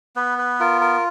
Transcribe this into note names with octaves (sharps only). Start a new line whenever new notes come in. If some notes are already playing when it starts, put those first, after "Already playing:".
B3 B4
B4
F4 A#4
A#4